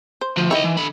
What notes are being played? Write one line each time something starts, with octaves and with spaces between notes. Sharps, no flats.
C5
D2 F3
D#3 E4 C#5 D#5
E3
D3 B5